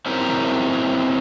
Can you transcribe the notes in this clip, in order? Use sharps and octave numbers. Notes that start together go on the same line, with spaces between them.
C4 C#4 E4 G4 A#4